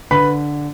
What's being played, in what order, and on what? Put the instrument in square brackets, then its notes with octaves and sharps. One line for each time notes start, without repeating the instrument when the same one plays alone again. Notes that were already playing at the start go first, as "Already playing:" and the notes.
[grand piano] D3 B4 B5